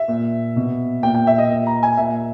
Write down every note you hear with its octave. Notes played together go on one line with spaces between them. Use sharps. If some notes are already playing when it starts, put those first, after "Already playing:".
Already playing: E5
A#2
B2
A#2 G5
G5
E5
D#5
A#2
A#5
G#5
A#2 E5